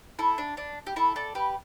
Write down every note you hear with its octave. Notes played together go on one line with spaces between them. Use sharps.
E4 A4
D4
D4
G4
E4 A4
A4 D5
G4 B4